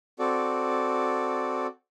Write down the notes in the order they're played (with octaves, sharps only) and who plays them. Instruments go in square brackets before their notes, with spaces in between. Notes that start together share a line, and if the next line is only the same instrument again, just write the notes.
[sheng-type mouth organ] C4 F#4 A4 D5